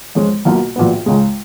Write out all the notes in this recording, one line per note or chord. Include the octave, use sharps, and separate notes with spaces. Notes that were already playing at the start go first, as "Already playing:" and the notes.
F2 F3 G#3 C#4
B1 B2 A#3 F4
A#1 A#2 F#3 B3
C#2 C#3 G#3